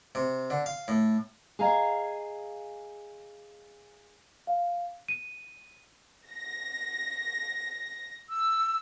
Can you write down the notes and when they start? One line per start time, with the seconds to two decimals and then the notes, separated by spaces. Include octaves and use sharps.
0.15 C3
0.50 D3
0.66 F5
0.88 A2
1.59 G#4 D#5 F5 G#5 A#5
4.47 F5
5.08 D#7
6.29 A#6
8.30 E6